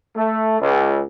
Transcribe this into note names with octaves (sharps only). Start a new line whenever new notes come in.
A3
C#2